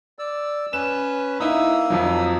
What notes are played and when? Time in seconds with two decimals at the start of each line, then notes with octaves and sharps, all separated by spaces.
0.19 D5 E6
0.73 C#4 B4 E7
1.40 A#3 D#4 E4 D#6 E6
1.90 F2 F3 F#3